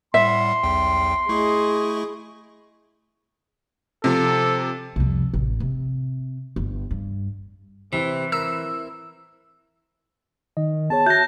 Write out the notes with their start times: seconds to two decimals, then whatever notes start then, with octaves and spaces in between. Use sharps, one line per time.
0.14 A2 G3 E5 F#5 C6
0.63 B1 E2 G5
1.29 A3 E4 G#4 D#5 C#6
4.04 C3 F3 A4
4.96 C2 F2
5.34 A1
5.60 C3
6.56 G1
6.91 G2
7.93 C3 E3 C4 E4
8.32 A#4 E6
10.57 D#3 D#5
10.90 B3 G#4 C#5 A5
11.06 F#4 E5 F#6 G6 A#6